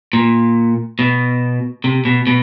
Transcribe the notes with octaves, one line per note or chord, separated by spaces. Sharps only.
A#2
B2
C3
B2
B2